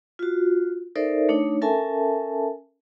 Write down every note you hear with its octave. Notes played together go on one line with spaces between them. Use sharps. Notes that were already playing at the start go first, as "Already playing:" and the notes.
F4 F#4
D#4 A4 A#4 C5 D5 E5
A3 D4 D#4 C#5
C#4 A4 A#4 E5 G#5 A5